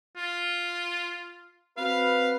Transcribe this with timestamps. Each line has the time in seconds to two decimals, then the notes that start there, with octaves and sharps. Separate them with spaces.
0.16 F4
1.77 C4 F#4 B4 F5